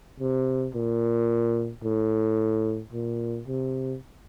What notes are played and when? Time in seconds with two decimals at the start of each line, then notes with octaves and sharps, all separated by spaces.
0.20 C3
0.75 A#2
1.84 A2
2.93 A#2
3.47 C3